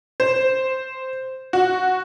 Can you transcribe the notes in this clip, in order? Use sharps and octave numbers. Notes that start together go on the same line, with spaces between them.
C5
F#4